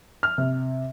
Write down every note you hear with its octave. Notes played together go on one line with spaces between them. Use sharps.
F6
C3